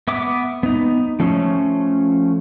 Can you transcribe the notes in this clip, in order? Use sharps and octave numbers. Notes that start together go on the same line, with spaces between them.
B3 E5 D6
B3 D#4
F3 A3 C#4